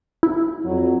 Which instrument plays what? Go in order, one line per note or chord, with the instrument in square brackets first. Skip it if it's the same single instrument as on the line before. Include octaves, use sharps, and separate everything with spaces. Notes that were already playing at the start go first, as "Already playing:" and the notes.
[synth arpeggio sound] E4
[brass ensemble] F2 F#3